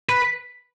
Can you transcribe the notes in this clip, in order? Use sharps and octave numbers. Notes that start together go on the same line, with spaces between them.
B4